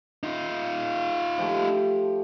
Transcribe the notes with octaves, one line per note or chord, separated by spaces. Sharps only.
D#4 F4 F5
F3 A3 G4